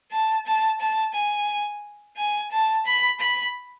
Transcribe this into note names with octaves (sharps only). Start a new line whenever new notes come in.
A5
A5
A5
G#5
G#5
A5
B5
B5